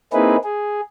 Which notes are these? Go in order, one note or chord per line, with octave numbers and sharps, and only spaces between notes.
A#3 C4 D#4 E4 G#4 B4
G#4